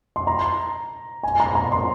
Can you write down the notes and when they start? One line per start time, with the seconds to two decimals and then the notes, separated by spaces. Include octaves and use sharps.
0.16 C6
0.27 A#5
1.23 G#5
1.40 A#5
1.55 A#5
1.72 C6